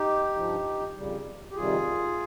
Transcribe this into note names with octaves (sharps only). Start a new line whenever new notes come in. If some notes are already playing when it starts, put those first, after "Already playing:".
Already playing: D#4 G4
G2 F3
F2 C#3 G3
G4
F2 C3 D#3 G3 F4 G#4